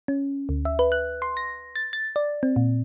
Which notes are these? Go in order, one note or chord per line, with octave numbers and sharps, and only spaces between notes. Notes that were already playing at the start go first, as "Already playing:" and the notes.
C#4
D2
E5
B4
F#6
C6
A#6
A6
A6
D5
C4
A#2